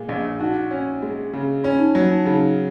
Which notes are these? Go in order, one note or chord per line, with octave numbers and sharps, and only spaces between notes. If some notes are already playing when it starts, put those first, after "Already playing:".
Already playing: A#2 G#3
A#1 D#5
C#5
D#4 F#4
C#4
G#3
C#3
C#4 F4
D#4
F#3 F4
D#4
C#3 D#4